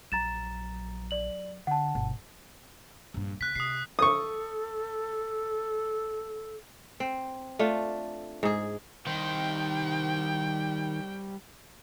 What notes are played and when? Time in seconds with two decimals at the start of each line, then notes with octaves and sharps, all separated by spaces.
0.12 A#1 F#3 A#5 A6 E7
1.11 D5 F#7
1.67 D3 F#5 A5
1.95 G1 B2
3.14 A#1 G2
3.41 C#3 F#6 B6
3.56 C3 D#6 C7
3.99 A4 C#6 D#6
7.00 C4
7.59 A3 D4 F4
8.43 G#2 G#4
9.07 D#3 G3 G4 C5 G5